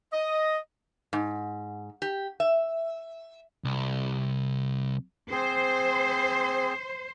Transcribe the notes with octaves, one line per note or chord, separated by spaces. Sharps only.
D#5
G#2
G4
E5
C2
C4 G#4 C5